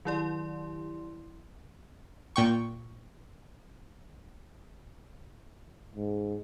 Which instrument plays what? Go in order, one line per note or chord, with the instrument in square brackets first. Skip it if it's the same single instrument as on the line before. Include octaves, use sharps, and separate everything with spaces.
[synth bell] D#3 F#3 E4 G4 D5 C6
[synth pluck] A#2 G5 C#6
[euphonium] G#2